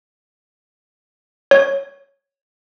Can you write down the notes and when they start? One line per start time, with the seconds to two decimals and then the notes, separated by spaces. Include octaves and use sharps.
1.51 C#5